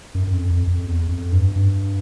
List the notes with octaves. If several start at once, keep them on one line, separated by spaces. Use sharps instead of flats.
F#2
F#2
F2
F2
F2
E2
F2
G2
G2